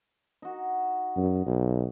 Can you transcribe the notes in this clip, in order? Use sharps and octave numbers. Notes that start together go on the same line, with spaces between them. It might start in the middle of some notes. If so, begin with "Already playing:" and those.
D#4 F#4
F#2
B1